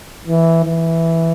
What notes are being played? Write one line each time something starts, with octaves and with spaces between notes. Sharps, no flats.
E3
E3